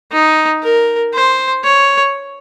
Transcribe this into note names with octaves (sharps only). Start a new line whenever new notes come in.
D#4
A#4
C5
C#5